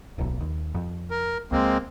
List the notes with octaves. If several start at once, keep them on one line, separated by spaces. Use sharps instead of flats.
D1 B1
D#2
F2
A#4
C#2 G#3 A#3 C4